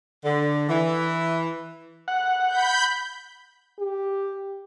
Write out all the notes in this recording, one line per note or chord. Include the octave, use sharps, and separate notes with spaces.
D3
E3
F#5
B5 G6
G4